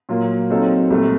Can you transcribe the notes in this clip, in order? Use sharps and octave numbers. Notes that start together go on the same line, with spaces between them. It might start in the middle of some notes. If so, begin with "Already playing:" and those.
A#2 F#3 A#3 F4
C3 F#3 C4 D#4 A4
C2 A#2 A3